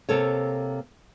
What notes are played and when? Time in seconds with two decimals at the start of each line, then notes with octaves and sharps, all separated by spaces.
0.09 C3 A#3 A4 C#5